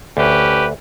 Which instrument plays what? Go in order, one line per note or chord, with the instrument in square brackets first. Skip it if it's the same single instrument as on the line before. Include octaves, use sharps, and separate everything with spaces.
[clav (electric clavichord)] D2 [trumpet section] C#4 G4 B4